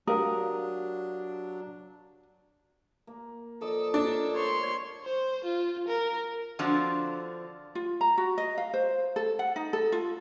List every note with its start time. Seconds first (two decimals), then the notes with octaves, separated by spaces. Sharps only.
0.07 F#3 D4 G4 A#4 F5 D#6
3.07 A#3
3.61 F3 A4 D5 D#5
3.94 D4 A#4 C#5
4.35 C5 C#5 C6
5.04 C5
5.44 F4
5.88 A#4
6.59 D3 F3 C4 D4 F4 F#4
7.75 F4
8.01 A#5
8.18 F#4
8.38 D#5
8.58 F5
8.73 C5
9.16 A4
9.39 F#5
9.56 D#4
9.73 A4
9.92 F4